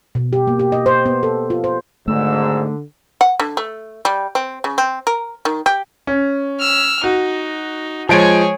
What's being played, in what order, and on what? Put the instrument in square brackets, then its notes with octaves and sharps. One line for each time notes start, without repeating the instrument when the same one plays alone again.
[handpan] B2
G4
A#3
G4
D#5
C5
B3
A4
F4
C5
[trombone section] G#1 G#2 [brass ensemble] D3 [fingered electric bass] A3 [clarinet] E6
[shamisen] F#5
D3
A3
G3
C4
C#3
C4
A#4
D#3
G4
[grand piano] C#4
[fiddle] E6 F6
[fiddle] D#4 [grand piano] F#4
[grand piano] F3 G#3 D7 [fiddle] G#4 C#5